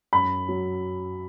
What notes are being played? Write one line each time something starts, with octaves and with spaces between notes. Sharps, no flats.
F#2 B5
F#3